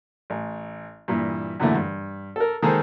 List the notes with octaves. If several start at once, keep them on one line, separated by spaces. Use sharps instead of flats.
A1
G2 A#2 E3
F#2 A#2 D3 E3 A3
G2
A4 A#4
D#3 G#3 A#3 G#4 A4 C5